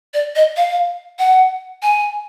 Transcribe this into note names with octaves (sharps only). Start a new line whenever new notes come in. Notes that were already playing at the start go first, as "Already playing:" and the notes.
D5
D#5
F5
F#5
G#5